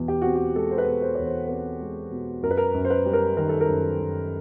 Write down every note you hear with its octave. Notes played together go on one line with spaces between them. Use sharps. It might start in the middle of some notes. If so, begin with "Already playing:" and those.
Already playing: E2 B2
G4
C4 F#4
G4
G#3 A4
C5
B4
B2
C5
E2 C#5
C5
C4 B4
G#3
B2
F#2 A#4
B4
A#4
F#2
C5
B4
G3
A#4
D#3 A#4
A4
A#4
F#2
F#2